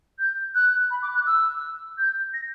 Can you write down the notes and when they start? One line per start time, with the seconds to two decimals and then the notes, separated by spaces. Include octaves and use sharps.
0.19 G6
0.55 F#6
0.91 B5
1.02 D6
1.15 F#6
1.27 E6
1.98 G6
2.34 A#6